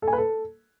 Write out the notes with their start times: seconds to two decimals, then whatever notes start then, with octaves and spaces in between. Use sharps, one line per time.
0.02 A4
0.08 G#5
0.13 B4
0.18 A4